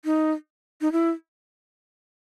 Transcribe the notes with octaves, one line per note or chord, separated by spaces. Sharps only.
D#4
D#4
E4